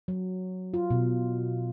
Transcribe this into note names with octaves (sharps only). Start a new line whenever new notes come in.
F#3
F4
B2